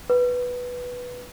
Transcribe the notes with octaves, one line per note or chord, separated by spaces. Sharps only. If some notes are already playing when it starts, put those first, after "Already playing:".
B4